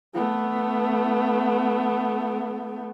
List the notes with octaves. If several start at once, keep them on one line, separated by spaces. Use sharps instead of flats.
A3 B3